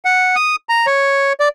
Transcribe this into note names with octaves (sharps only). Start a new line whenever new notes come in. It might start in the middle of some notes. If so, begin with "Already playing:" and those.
F#5
D#6
A#5
C#5
D5